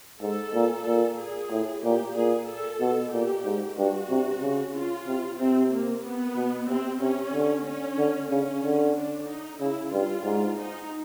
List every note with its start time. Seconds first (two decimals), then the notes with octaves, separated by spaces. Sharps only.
0.21 G#2 A4
0.54 A#2
0.86 A#2
1.19 G#4
1.51 A2
1.83 A#2 G4
2.16 A#2 G#4
2.48 A4
2.81 B2
3.13 A#2 G4
3.45 G#2
3.77 G2 F#4
4.10 C3
4.42 C#3
4.75 F4
5.06 C3
5.39 C3 C4
5.71 A#3
6.05 B3
6.36 B2
6.68 C3 C4
7.01 C3 C#4
7.34 D3
7.66 C#4
7.98 D3
8.30 C#3 C#4
8.63 D3
8.96 D4
9.27 D#4
9.60 C#3 E4
9.92 G2 F4
10.24 G#2
10.57 D#4